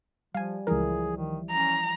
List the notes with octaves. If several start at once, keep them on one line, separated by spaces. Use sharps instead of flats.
F3 G3 F5 G#5
C#2 E3 F3 E4 G#4 A#4
D#3
C#4 A#5